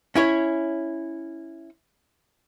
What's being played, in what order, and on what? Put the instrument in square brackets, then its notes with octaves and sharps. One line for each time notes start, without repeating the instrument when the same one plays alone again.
[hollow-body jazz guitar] C#4 E4 C#5